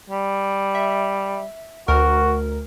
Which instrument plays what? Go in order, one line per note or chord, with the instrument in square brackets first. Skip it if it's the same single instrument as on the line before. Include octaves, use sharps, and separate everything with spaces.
[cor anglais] G3
[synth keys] E5
[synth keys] D2 A#4 [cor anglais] F#4